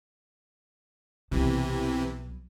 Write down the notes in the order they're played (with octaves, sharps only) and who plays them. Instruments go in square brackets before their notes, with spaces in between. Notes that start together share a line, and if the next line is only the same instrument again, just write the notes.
[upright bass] B1 F#3 [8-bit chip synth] C3 E3